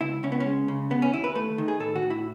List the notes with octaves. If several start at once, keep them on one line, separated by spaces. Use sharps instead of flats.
C#2 E4
C#2 C#4
B3
C#4
G#3
C#3
D#2 B3
C#4
D#2 E4
B4
A3 B4
D#3
G#4
A2 A4
F#4
A2
E4